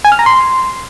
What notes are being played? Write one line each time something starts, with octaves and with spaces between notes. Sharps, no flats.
G#5
F6
A#5
C6